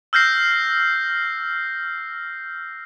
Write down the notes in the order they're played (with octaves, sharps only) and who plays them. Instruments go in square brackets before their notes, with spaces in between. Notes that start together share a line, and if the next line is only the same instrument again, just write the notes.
[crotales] E6 F6 G6 A#6 C7